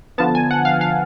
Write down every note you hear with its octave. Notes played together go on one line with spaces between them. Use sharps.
D3 F3 B3 A5
G#5
F#5
F5
F5